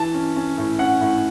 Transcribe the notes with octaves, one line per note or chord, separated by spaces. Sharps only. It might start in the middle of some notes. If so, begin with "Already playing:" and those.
Already playing: E3 A5
C#4
C#4
A2
C#4 F#5
A2